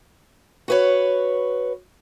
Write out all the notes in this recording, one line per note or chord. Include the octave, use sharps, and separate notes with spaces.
F#4 B4 C#5